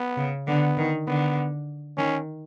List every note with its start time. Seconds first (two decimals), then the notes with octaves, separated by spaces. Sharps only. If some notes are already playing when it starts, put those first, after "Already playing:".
Already playing: B3
0.17 C#3
0.47 D3 B3
0.78 D#3
1.07 D3 B3
1.98 D#3 C#4